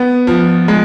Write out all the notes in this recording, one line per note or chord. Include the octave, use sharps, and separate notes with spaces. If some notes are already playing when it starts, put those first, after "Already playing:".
Already playing: B3
F3
G#3